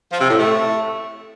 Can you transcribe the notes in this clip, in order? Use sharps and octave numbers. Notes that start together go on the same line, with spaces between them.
F3
C3
A2
A3